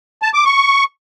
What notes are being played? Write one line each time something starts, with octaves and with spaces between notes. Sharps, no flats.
A5
D6
C#6